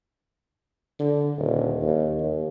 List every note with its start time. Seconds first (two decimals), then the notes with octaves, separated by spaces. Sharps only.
1.00 D3
1.38 D#1
1.82 D#2
2.20 D#2